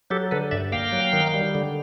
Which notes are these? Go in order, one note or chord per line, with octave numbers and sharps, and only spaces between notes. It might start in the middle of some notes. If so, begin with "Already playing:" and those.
F#3 G4 A4
D3 A4 B4
G2 D5 E5
A#3 F5 G5
F#3
D#3
G3
D3